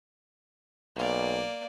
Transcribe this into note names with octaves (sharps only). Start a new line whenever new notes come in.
B1 A#3 D5